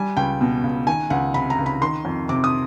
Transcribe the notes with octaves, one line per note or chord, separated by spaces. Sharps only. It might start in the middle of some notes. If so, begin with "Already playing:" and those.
Already playing: G3 G#5
C#2 G5
B2
C#2
D#3 G#5
C#2 F#5
C3 B5
A#5
C#2
B5
D#3 C6
F2
C3 D6
D#6